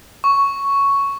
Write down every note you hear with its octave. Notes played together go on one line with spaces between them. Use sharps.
C#6